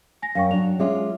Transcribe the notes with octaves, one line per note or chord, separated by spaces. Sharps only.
G#5 A#6
F#2 F5 G5 C#6
F#3 D4 F7
G#3 C#4 F4 E5 D6